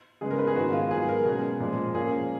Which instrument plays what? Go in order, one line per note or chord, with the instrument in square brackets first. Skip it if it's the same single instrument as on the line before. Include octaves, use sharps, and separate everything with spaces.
[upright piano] C#3 G#3 B3 G#4
A#4
B4
G#4
G#2 D#3 G#3 B3 F#4
F4
G#2 F#3 B3 G#4
A#4
B2 G#3 C#4 G#4
A#2 F3 G#3
A#2 F3 A#3 C#4 G#4